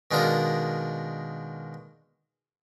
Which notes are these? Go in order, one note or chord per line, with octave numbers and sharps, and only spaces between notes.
B2 D#3 G#3 D4 F4 A#4